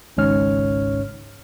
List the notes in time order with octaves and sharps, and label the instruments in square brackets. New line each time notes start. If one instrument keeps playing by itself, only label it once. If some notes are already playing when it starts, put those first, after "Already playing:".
[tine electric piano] G#1 C#2 G#2 C#4 C#5 F6